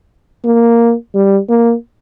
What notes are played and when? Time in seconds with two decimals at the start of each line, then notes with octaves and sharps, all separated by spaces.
0.45 A#3
1.15 G3
1.49 A#3